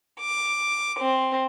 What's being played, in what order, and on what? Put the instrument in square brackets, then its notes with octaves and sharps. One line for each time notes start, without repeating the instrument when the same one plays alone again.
[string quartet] D6
C4